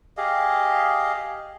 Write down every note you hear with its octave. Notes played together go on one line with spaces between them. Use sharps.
G4 G#4 D#5 F5